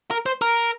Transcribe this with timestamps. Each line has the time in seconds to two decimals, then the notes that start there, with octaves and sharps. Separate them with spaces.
0.11 A#4
0.26 C5
0.42 A#4